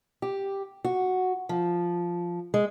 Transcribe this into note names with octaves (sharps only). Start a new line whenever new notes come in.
G4
F#4
F3
G#3